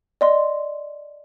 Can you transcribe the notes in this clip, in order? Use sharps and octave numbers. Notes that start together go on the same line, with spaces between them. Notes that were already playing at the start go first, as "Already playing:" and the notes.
D5 D#5 C6